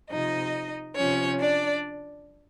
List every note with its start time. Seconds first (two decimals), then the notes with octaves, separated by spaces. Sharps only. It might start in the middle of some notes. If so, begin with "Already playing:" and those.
0.11 C3 F3 D#4 D#5
0.96 C3 F3 C#4 C#5
1.40 D4 D5